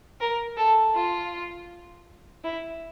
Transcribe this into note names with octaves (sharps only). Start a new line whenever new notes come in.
A#4
A4
F4
E4